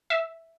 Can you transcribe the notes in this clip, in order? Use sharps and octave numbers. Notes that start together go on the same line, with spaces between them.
E5